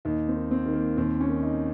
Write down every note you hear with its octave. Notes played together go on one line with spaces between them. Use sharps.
D#2 D#4
C4
D#3
C4
D#3
A#3
D#2 C4
C#4
D#3
D#4